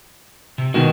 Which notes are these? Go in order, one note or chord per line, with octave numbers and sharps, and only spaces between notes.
C3
B2 D#3 G#3 F#4